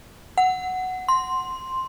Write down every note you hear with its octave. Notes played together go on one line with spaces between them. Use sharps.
F#5
C6